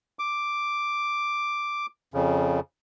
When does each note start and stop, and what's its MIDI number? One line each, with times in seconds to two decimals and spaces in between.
0.19 1.86 86
2.14 2.60 41
2.14 2.60 49